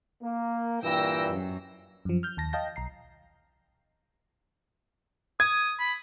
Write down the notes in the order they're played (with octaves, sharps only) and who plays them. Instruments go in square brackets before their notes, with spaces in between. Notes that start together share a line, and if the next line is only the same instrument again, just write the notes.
[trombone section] A#3
[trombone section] G2 A#2 E3 [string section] G5 E6 A#6
[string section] F#2
[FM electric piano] F#2 F3
F6 G6
D#2 A5 A#6
D#5 F5 G5 A5 G6 A#6
B1 A#5 C7
[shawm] D#6 [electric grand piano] G#6
[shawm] B5